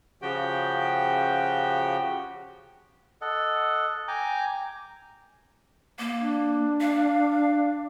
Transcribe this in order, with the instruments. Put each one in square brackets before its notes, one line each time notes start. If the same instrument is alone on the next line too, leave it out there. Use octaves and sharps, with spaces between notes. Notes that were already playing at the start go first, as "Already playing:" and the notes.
[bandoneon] C#3 F3 F#4 G4 G5
[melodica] A4 D#5 F#5
G5 G#5 A#5 D6
[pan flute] A#3
[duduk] D4
[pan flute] F5